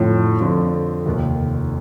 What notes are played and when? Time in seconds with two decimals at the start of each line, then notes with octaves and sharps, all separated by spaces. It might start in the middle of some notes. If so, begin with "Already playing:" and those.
Already playing: F2 A2 D3 F3 C4
0.40 F2 D3 F3 C4
1.06 F1 D#2 D#3